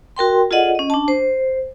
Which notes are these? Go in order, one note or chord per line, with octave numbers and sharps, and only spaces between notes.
F#4 A#4 G5 C6
F4 G#4 A4 D5 D#5 F#5
C#4 D#5
D4 A5
C5